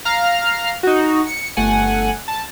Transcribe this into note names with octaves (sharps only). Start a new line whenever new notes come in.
F5 A#5 F6
D#4 F#4
C#7
G1 A3 F#5 G#5
A5